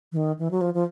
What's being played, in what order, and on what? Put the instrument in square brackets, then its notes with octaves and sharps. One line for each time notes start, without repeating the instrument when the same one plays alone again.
[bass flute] E3
D#3
E3
F#3
F3
F3